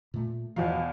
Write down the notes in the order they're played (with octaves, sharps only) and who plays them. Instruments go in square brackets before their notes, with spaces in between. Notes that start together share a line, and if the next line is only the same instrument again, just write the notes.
[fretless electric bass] A#2 A3
[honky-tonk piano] E2 B2 F5 [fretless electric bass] F3